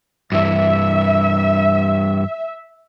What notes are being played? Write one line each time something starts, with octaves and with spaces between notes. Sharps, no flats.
G2 E3 E5